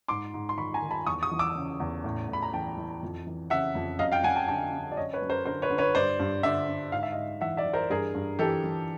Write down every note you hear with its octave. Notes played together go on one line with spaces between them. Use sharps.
G#2 C6 D6
G#2
C6
D#3 B5 C#6
G#5 A#5
D#3
A5 B5
E2 C#6 D#6
C#6 D#6
E3
D6 E6
C#3
E2
A2
A2
B5
A#5
E3 G5 A5
E3
F2
E3
C#3 E5 F#5
F2
F#2 D#5 F5
F5 G5
F#2 F#5 G#5
G5 A5
D3 G5 A5
D3
D5
F#2 C#5 D#5
B4 C#5
F#2
A#4 C5
D3 A#4 C5
B4 C#5
D3
B4 C#5
G2 C5 D5
G2
D3 D5 E5
D3
G#2 F5
E5
D#5 F5
G#2
E3 E5 F#5
D5 E5
E3
A#4 C5
G2 G#4 A#4
G2
E3 G4 A4
E3